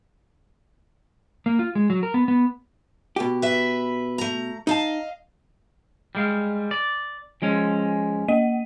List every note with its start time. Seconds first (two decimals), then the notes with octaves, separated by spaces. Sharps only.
1.46 A#3
1.59 F4
1.75 G#3
1.90 F#3
2.03 A#4
2.14 B3
2.28 B3
3.16 B2 G4
3.42 B4 E5
4.18 A3 A#5
4.67 D#4 D#5 F5 A5
6.15 G3 G#3 F5
6.71 D5
7.42 F3 G#3 C#4
8.28 A#3 D#5 D#7